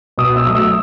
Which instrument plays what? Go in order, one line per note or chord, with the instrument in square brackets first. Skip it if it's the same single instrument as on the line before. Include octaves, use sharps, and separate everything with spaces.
[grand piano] B2 D#6
E6
F#3 A3 D#6
E6